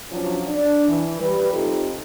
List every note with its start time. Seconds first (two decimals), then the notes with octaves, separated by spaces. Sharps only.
0.11 F3 F#3 C#4 D4
0.47 D4
0.88 E3
1.20 G3 B4
1.51 C3 D#4 F4 G4 A4